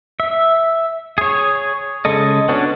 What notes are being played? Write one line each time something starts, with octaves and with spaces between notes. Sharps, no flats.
E5
G#4 C#5
C#3 G#3 A4 D#5
B3 C#4 D4 F#4